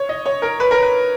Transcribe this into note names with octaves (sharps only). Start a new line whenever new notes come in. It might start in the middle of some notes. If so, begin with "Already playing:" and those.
Already playing: C#5
D#5
C#5
A#4
B4
A#4
B4